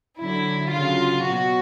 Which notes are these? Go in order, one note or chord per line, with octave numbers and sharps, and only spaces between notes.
D3 F#3 E4
C#3 F#3 F4
B2 F#3 F#4